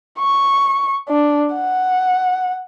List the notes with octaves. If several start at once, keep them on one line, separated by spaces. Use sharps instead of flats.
C#6
D4
F#5